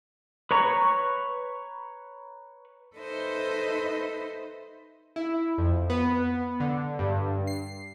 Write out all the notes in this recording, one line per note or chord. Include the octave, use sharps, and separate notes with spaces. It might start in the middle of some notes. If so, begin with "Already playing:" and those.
B4 C#5 A#5 C#6
D#4 A4 B4 C5 D#5 E5
E4
F2
B3
D3
G2
C7